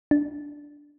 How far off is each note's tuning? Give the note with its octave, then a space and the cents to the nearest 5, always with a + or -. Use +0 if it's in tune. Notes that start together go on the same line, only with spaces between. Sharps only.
D4 -5